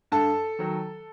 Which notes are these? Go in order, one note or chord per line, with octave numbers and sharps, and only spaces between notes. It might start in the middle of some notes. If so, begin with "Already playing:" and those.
G2 A4 A5
D#3 F#3